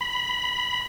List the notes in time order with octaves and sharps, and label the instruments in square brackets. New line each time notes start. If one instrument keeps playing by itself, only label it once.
[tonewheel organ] B5